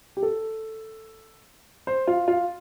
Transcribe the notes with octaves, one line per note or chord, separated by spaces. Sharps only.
G4
A4
C5
F4
F4